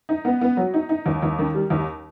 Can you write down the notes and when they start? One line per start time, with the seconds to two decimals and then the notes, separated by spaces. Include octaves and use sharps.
0.09 D#4
0.25 B3
0.41 B3
0.57 F#3
0.74 D#4
0.89 D#4
1.06 D#2
1.23 D#2
1.39 D#3
1.55 G3
1.70 D#2